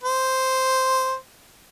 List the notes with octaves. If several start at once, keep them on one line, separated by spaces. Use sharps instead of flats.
C5